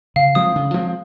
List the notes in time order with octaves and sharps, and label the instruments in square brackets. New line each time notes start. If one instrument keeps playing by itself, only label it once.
[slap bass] C#3 [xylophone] F5
[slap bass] F3 G#3 C4 [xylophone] D#6
[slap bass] C#3
F3 G#3 C4